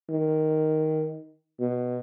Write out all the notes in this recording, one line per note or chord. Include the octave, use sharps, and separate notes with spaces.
D#3
B2